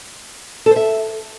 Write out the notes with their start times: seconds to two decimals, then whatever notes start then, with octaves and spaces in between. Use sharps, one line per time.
0.66 A4
0.71 C5
0.76 E5